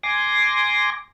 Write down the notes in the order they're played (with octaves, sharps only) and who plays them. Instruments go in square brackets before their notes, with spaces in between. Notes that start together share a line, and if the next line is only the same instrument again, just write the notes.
[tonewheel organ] G#5 C6 D6 A#6